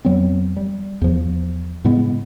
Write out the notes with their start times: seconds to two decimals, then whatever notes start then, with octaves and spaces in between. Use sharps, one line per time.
0.05 F2 F#3 B3 C4
0.57 G3
1.02 E2 F3
1.85 A2 C#3 G#3 B3